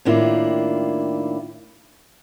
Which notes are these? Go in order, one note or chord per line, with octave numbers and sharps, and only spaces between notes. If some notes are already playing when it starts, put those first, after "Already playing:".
A2 D#3 A#3 D4 E4 F4